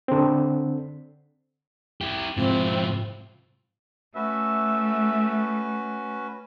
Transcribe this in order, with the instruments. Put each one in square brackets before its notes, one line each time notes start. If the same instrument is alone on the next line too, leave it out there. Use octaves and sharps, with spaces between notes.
[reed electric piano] D3 C4
[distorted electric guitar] E4 G4
[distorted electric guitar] G#2 E4 [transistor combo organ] C3 F3 [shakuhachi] C4
[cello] A3 [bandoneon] C#4 F#4 B4 [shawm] E5